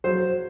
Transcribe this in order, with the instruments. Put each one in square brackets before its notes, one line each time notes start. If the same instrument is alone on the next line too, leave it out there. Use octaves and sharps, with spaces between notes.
[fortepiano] F#3 C5